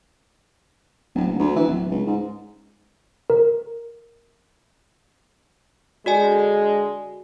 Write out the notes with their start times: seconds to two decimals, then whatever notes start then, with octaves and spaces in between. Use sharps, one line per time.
1.15 D1
1.27 F#1
1.39 D2
1.56 E3
1.68 D1
1.91 C#2
2.07 G#2
3.30 A#4
6.06 D3 G#3 F#4 D5 G#5